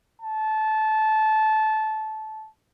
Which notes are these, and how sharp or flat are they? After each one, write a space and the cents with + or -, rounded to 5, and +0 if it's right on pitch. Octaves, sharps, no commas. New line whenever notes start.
A5 -20